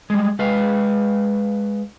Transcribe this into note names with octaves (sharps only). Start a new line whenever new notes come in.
G3 G#3
G#3 B4 D#5 F5